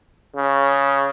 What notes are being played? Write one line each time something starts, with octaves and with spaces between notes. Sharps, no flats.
C#3